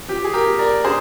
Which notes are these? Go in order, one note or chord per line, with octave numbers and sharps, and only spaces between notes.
F3 G4
G#4
G4 A#4
A#3
A#4 D5
D4 G#4 C5